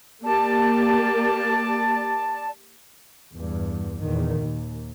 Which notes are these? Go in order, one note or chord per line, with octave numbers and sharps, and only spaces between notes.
A#3 G4 D5 A5
E2 G2
E2 A#2 D#3
D#2